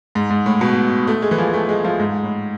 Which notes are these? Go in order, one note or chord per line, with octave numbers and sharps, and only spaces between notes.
G#2
G#2
A2
B2
A3
G#3
E3
F3
A3
G#3
F3
G#2
A2